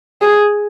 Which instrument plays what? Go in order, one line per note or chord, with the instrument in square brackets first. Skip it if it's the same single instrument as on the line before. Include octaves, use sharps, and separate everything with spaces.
[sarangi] G#4